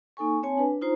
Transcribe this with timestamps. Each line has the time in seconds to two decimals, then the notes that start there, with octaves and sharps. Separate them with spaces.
0.17 A#3 D#4 A4 G#5 C#6
0.43 C4 C#5 G#5 A5
0.58 D4 B4
0.81 D#4 F4 C5 A#5